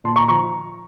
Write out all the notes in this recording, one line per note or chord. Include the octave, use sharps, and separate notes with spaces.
A#2 A5 C6
A#5 C#6
F3 A#5 C#6